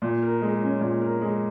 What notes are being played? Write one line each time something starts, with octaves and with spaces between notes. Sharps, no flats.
A#2
A#4
G#3
C#4
A#2
A#4
G#3